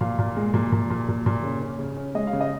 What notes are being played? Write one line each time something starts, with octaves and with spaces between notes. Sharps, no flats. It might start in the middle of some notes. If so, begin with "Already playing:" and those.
A#2 F5
A#2
G#3
A#2
A#2
A#2
A#2
A#2
C#3
C#4
C#3
C#4
G#3 D#5
F5
C#3
D#5